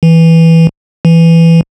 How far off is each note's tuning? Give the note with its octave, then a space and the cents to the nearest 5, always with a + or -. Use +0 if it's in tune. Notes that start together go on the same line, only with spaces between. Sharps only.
E3 -5
E3 +10